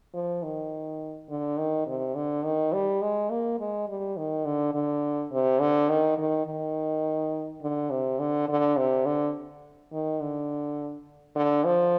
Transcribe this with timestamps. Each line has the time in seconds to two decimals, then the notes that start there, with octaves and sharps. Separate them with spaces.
0.14 F3
0.43 D#3
1.29 D3
1.58 D#3
1.86 C3
2.15 D3
2.44 D#3
2.73 G3
3.02 G#3
3.30 A#3
3.60 G#3
3.88 G3
4.17 D#3
4.45 D3
4.74 D3
5.32 C3
5.61 D3
5.89 D#3
6.18 D#3
6.46 D#3
7.62 D3
7.90 C3
8.19 D3
8.49 D3
8.77 C3
9.06 D3
9.92 D#3
10.21 D3
11.36 D3
11.65 F3